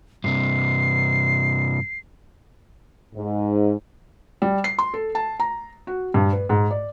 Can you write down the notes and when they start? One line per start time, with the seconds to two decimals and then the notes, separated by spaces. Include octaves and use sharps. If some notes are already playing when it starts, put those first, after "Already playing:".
0.24 G2 C3 C7
3.15 G#2
4.42 G3
4.64 C7
4.79 C6
4.94 A4
5.15 A5
5.40 A#5
5.87 F#4
6.14 G2
6.33 B4
6.49 G#2
6.71 D5